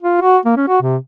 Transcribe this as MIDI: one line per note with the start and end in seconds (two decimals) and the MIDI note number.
0.02 0.18 65
0.22 0.38 66
0.45 0.56 58
0.57 0.65 61
0.68 0.79 66
0.82 0.97 48